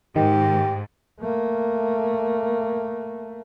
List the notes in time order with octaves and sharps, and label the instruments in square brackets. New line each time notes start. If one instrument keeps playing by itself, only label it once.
[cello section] G#2 [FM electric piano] D#3 [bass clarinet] G4
[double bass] A3 A#3